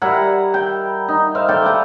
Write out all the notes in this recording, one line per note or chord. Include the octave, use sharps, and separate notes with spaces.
G3 E4 A#4 F#5
G5
D#4
C5 E5 F5
A4 D5 G5
B4 G5 A#5